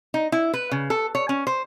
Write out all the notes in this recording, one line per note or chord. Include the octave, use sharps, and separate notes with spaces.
D#4
E4
B4
C#3
A4
C#5
C#4
C5